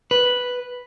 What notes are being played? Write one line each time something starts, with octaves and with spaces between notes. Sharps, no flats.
B4